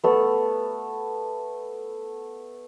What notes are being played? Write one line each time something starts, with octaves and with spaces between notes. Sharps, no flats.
A3 B3